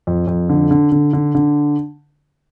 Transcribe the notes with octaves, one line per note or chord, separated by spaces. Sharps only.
F2
F2
D3
D3
D3
D3
D3